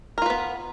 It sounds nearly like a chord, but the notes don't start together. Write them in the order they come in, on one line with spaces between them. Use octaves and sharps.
A#4 F4 B4 B3